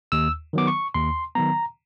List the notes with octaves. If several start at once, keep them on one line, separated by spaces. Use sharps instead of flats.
D#2 E6
D#3 F#3 B3 D6
C#6
D#2 C6
D#3 F#3 B3 A#5